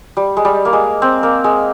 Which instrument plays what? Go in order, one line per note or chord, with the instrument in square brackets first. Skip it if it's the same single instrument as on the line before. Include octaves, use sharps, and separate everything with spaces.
[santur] G3
G#3
G3
A#3
G#3
C4
A#3
G#3